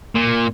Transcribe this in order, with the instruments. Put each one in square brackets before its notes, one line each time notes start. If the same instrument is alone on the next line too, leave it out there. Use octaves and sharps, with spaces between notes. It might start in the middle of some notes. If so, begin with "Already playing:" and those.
[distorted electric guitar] A#2